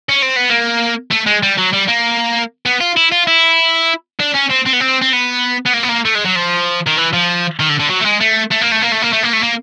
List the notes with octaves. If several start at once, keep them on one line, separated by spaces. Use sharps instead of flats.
C#4
C4
B3
A#3
A3
G#3
G3
F#3
G3
A#3
B3
F4
E4
F4
E4
D4
C#4
C4
C4
B3
C4
C4
B3
B3
A#3
B3
A#3
A3
G#3
F#3
F3
D#3
E3
F3
D#3
D3
D3
F#3
A3
G#3
A3
A3
A#3
A3
A#3
A3
A#3
A3
A#3
A3
A#3